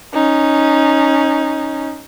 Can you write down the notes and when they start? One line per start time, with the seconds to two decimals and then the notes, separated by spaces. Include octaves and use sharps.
0.14 C#4 D#4